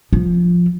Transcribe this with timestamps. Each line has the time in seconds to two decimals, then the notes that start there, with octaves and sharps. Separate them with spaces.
0.13 F3